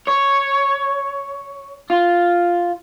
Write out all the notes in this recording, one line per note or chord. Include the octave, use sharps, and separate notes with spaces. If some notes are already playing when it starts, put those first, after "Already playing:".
C#5
F4